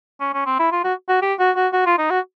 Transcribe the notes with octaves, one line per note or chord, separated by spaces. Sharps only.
C#4
C#4
C4
E4
F4
F#4
F#4
G4
F#4
F#4
F#4
F4
D#4
F#4